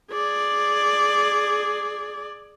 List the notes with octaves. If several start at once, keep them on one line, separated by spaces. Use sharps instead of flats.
G#4 D5